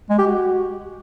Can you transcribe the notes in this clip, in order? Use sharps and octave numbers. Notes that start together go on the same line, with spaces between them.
G#3
G4
F#4